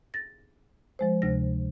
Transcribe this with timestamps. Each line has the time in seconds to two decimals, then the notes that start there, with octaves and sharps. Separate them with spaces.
0.14 A6 A#6
0.99 F3 G#3 C5
1.22 D2 C3 A#6